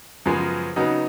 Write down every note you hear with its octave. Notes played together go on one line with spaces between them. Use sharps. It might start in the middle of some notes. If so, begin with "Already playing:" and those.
F#2 C#3 F3 G#3 B3
C#3 F#3 B3 D#4